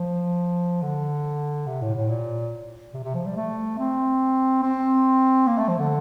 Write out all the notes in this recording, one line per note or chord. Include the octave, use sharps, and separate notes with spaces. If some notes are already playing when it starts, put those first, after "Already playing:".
Already playing: F3
D3
C3
A2
A2
A#2
C3
C3
F3
G3
A3
C4
C4
A#3
A3
F3
D3